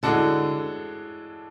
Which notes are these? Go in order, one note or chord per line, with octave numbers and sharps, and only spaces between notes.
A2 D3 G#3 D4 F#4 A4